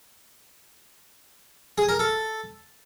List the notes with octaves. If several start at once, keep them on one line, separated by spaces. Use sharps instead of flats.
G#4
A#4
A4